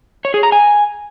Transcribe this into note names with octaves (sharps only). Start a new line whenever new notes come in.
C#5
G#4
A#5
G#5